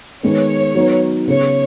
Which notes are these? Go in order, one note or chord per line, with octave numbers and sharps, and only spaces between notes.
D#3 G#3 B3 C#5
F#3 B3 D#4
C#3 B3 G#4 C#5